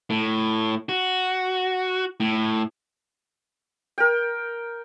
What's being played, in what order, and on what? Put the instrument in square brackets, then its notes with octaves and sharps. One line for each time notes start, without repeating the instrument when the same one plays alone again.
[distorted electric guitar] A2
F#4
A2
[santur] A#4 G5